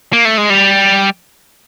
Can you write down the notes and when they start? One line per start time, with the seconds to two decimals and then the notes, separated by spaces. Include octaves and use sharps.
0.13 A#3
0.25 A3
0.38 G#3
0.50 G3